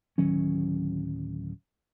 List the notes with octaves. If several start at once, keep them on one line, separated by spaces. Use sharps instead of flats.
D1 D#3 F#3 C#4